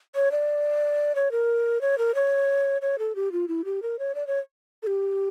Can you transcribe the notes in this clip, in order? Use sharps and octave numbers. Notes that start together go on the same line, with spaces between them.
C#5
D5
C#5
A#4
C#5
A#4
C#5
C#5
A4
G4
F4
E4
G4
A#4
C#5
D5
C#5
A4
G4